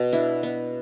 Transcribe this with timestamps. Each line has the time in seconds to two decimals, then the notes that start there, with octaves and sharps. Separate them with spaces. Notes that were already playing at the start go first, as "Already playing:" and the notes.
Already playing: B2
0.13 D4 E4
0.43 B3